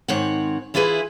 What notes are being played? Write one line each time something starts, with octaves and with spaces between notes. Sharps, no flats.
G#2 D#3 C4 C#5 F#5
E3 E4 F4 G#4 B4